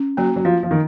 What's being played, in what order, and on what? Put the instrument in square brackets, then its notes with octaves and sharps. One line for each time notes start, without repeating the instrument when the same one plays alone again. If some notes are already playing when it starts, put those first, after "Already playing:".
Already playing: [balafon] C#4
[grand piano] F#3 [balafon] A#3
[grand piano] F#3
F3
[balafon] F4
[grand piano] F3
D#3